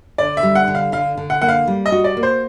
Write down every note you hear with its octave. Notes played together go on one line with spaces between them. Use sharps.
D3 D5
E5
G3
F#5
D3
F5
D3 F5
D3
F#5
A#3 F#5
F5
G3
D#5
F#4
D5
A#3
C5